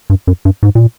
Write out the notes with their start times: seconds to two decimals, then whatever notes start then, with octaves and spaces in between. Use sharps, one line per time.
0.10 G2
0.27 F#2
0.45 G2
0.63 G#2
0.75 A#2